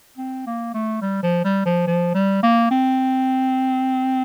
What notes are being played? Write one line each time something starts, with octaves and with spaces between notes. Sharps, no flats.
C4
A#3
A3
G3
F3
G3
F3
F3
G3
A#3
C4